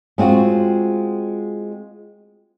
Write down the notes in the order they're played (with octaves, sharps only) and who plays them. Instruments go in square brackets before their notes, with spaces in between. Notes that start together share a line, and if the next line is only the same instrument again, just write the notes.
[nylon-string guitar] G#3 C4 F4 F#4